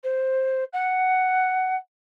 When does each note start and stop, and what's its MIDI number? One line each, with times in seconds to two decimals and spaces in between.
0.03 0.64 72
0.73 1.76 78